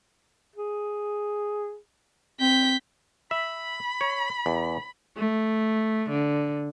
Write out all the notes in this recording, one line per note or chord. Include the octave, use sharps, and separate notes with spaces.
G#4
C4 G6 B6
E5 B5
C#5
E2
A3
D3